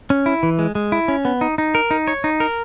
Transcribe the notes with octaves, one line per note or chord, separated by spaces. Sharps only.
C#4
E4
E3
G#3
G#3
E4
C#4
B3
D#4
D#4
A#4
D#4
C#5
D#4
A#4